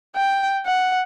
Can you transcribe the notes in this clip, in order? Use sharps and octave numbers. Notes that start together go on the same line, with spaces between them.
G5
F#5